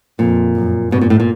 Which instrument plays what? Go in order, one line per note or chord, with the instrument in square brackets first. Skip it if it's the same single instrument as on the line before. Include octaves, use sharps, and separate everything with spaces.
[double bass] F2 [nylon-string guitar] A#2
[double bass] F#2
[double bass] G2 [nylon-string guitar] B2
[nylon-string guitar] A#2
A2
A#2